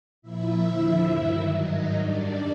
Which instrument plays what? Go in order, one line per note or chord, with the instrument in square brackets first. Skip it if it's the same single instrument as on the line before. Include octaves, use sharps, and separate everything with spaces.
[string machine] A#2 F3 E4 E5
D#2 D3 F3
G2 D#3 F#3
G#2 D#3 F#3 D#4 D#5
F#2 D#3 G3 D4 D5